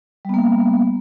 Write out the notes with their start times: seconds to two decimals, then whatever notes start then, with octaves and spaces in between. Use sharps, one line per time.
0.25 G3
0.29 B3
0.34 A#3